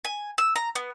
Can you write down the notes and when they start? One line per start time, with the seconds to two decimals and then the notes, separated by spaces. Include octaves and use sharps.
0.05 G#5
0.38 E6
0.56 A#5
0.75 B3